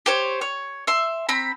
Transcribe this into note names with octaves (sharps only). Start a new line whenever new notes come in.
G4 C5 C#5
C#5
E5 C6
C4 A#5 B5